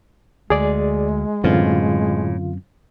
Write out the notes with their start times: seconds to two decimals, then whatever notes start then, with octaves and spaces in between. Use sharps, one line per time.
0.50 D2 G#3 G#4 D5
1.44 F#2 A2 D3 E3 C4 F4 F5